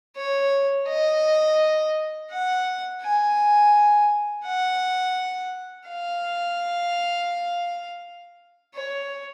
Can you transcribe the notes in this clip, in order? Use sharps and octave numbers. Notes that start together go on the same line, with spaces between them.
C#5
D#5
F#5
G#5
F#5
F5
C#5